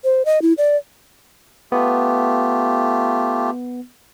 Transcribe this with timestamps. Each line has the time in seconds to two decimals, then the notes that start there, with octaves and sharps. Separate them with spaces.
0.04 C5
0.25 D#5
0.42 E4
0.58 D5
1.72 A3 B3 F4 G4